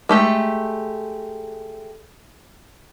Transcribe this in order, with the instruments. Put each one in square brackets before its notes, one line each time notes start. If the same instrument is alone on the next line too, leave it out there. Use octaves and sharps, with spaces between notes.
[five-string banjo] G#3 A3 G4